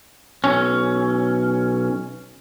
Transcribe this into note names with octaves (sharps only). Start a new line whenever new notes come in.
B1 C#4